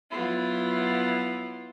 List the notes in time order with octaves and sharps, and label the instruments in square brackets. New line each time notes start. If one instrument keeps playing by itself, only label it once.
[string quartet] F#3 B3 E4 F4